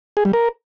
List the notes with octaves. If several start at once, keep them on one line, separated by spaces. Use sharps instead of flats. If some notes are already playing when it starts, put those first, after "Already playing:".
G#4
G3
A#4